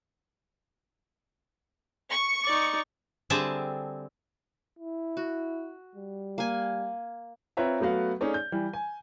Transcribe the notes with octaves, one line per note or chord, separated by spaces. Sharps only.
C#6
D#4 D5
D3 G3 C4 G#4 E5 A5
E4
F#4
G3
A#3 G#5
C4 F4 B4 C#5 E5 A#5
F#3 A3 B3 F#4 F5
A3 C#4 D#4 G#4 C#5 D5
G6
E3 G3
G#5